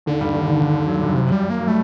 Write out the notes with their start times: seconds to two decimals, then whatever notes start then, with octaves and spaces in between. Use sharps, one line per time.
0.06 D#2 D3 D#3
0.21 G2 G3
0.34 D#2 D#3
0.47 D#2 D#3
0.60 D#2 D#3
0.87 F#3
0.95 G3
1.03 F#2 F#3
1.14 C3
1.32 G3
1.50 A#3
1.60 F#3
1.67 G3 A3